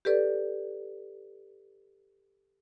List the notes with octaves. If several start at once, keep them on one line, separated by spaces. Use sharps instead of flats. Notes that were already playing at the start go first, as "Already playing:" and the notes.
G4 A4 B4 D5